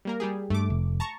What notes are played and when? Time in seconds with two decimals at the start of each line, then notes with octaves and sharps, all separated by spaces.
0.05 G3 A#3 A#4
0.20 G3 G4 G#4
0.50 G2 A3 D6
0.70 F1
1.00 A5 A#5 C#6